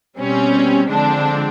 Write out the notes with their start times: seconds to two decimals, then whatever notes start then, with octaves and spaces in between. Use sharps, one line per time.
0.18 B2 G3 C4 C#4
0.89 D3 F3 G#3 C4 D4